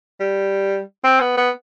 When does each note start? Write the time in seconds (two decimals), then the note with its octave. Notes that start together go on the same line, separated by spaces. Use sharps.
0.20 G3
1.04 C4
1.20 B3
1.37 B3